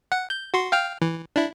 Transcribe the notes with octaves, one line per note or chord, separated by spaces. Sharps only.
F#5
G6
F#4 C6
F5 G5 F6
E3
D4 E4